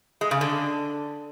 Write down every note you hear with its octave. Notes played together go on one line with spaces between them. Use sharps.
G#3
C#3
D3